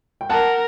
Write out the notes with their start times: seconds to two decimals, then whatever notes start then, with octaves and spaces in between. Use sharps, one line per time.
0.21 G5
0.30 A#4 F#5 A5